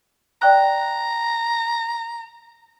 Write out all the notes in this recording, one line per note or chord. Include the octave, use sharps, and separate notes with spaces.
D5 G5 A#5 F#6